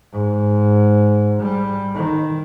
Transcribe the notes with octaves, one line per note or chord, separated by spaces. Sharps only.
G#2
G3
D#3